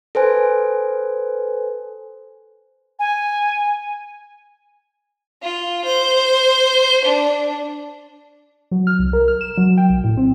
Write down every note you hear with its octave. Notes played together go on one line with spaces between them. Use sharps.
A4 B4 C5 G#5
G#5
F4
C5
D4
F#3
F6
C2
A#4
F6
E7
F#3
G5
B1
A2
C4